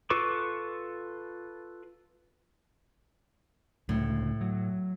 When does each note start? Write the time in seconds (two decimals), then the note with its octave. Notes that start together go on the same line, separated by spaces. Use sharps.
0.10 F4 A4 B4 C#6 D6
3.89 C#2 A2 D3
4.41 F#3